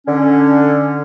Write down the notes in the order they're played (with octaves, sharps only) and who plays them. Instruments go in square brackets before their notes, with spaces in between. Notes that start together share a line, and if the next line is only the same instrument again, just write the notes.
[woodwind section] D3 C#4